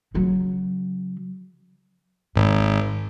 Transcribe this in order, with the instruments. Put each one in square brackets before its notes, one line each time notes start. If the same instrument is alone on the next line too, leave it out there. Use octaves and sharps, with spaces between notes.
[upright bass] C#3 F#3
[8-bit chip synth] G#1 [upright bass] G#2